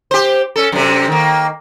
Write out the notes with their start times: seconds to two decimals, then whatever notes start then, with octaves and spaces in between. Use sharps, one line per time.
0.11 G4 C5
0.56 C#4 A4
0.72 F#2 C3
1.08 D#3 A#3